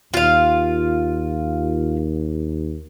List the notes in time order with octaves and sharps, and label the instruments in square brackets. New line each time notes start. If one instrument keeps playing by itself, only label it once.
[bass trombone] D#2 [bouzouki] F4 F5